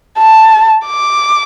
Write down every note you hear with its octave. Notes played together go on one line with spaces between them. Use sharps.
A5
D6